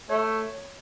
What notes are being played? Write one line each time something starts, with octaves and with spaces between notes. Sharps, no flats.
A3 C#5